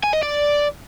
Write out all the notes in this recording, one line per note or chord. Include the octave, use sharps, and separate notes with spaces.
G#5
D#5
D5